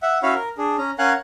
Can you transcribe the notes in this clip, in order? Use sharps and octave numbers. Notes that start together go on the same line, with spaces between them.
E5 F#5
C#4 E4 F#4 C#5 F5 B5
A#4
D4 G#4
C#4 A#5
C#4 A#4 F5 F#5 G#5 F#6